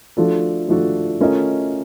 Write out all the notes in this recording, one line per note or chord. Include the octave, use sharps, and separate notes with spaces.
F3 A3 D4 F#4 A4
F3 A3 D4 F#4 A4
A3 C#4 F4 A#4 D#5